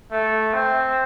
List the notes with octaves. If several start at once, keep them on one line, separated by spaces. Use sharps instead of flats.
A3
C4